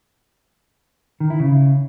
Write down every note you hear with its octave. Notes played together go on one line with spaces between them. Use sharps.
D#3
E4
C#3